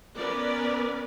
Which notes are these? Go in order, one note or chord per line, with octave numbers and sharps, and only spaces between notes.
B3 C#4 A#4 B4 D5